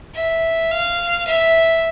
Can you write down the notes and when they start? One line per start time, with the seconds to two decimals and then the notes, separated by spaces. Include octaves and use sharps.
0.14 E5
0.71 F5
1.27 E5